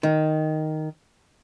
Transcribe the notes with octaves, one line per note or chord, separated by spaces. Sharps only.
D#3